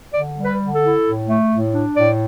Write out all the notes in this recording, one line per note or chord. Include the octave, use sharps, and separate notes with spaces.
D3 D5
G3
B4
D3
A4
E4
A2
A3
A2
D4
A2 D5